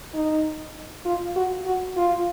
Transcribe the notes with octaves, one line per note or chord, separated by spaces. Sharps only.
D#4
F4
F#4
F#4
F4